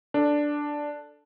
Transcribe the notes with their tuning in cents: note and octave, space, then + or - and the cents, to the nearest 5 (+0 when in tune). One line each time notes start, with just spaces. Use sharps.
D4 +0 A4 +0